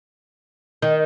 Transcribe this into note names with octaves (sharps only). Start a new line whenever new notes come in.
D#3